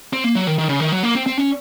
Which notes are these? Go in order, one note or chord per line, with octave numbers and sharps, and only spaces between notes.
C4
A#3
F#3
D#3
D#3
C#3
D#3
F#3
A#3
C4
C4
C#4